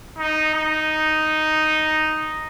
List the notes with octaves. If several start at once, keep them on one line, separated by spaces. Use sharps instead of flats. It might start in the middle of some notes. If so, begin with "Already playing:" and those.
D#4
D#4